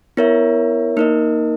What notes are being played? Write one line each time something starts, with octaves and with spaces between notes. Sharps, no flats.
B3 E4 A#4 C#5 E5
A#3 D#4 A#4 D#5